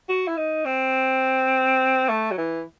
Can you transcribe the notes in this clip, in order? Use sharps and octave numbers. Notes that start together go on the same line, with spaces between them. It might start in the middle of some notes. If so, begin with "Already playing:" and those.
F#4
E4
D#4
C4
A3
F#3
E3